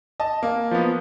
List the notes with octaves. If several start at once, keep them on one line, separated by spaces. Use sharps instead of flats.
D#5 A5
A#3
F3 B3